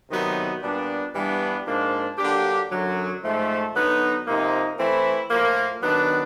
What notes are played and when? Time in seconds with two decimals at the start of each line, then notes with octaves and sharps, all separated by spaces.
0.10 C3 D#3 F#3 B3 D#4
0.62 A#2 G3 B3 D4
1.15 G2 E3 G3 B3 D4
1.66 G#2 F3 A#3 D4
2.18 D3 F#3 A#3 D4 G4
2.71 F#2 D3 F#3
3.22 G#2 F3 A3
3.74 D3 F#3 B3 D#4
4.27 C3 F3 A#3 D#4
4.78 E3 A3 C4 E4
5.31 A2 F3 A#3
5.82 D#3 F#3 B3 D4